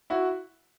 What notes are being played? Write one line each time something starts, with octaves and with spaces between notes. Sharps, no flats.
E4 F#4